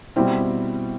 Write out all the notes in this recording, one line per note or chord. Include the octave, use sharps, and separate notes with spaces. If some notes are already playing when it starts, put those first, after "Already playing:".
B2 G3 C4 E4